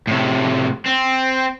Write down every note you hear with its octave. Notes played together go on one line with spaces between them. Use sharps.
A2 C3
C4